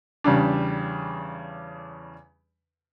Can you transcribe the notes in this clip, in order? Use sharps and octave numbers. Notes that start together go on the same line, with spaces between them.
E2 C#3 G3 D4